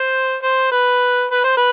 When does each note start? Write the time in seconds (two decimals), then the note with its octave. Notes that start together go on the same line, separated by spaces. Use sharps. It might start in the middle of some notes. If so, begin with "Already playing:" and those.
Already playing: C5
0.42 C5
0.72 B4
1.31 B4
1.44 C5
1.57 B4